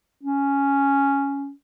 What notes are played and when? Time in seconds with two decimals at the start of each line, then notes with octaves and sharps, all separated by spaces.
0.23 C#4